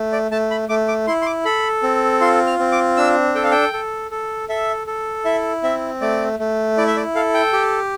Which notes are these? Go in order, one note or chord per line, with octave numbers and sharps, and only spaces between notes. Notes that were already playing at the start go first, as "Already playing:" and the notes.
Already playing: A3
D5
A3 A5
B5
A3 D6
D6
E4 C6
C6
D6
A4 B5
C4
F4 C6
F6
C4
D6
D4 E6
A4 G5
F5
G5
A4
A4
A4 E5
A4
E4 E5
C4 E5
A3 D5
A3
E4 D5
E5
D5
A4 F5
G5
G4